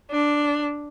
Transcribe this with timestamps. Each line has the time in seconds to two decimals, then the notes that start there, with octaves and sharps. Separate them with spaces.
0.11 D4